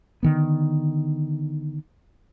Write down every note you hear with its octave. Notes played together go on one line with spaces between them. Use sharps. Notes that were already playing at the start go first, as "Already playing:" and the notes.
D3 D#3 B3